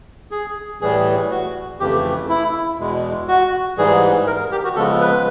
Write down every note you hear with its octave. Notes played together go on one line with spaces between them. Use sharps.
G#4
A2 E3 G3 G#4
F#4
F2 C#3 E3 A3 G4
E4
E2 B2 G#3
F#4
G#2 E3 G3 G#4
A#4
A#4
G4
F#4
C#3 F3 G#3 B3 A4
B4